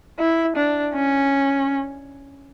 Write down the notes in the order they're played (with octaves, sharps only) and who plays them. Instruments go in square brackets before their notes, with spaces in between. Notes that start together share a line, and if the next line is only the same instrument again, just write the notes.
[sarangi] E4
D4
C#4